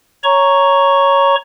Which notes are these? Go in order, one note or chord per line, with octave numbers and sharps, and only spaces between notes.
C#5 A#5 C#6